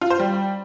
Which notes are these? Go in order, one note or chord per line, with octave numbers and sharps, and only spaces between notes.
F4
C5
G3